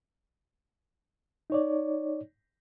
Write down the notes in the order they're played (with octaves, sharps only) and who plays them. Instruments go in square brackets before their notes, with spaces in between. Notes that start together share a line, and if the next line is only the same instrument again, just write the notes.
[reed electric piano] D#4 C#5 D5